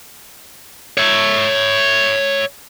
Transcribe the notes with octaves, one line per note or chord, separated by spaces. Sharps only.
C#5 E5